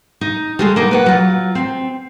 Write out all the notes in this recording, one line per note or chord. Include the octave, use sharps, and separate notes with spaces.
D#4
G3 G#3 A4
A#3 B3 D#4
B4 C#5 F#5
F#3 F4
C4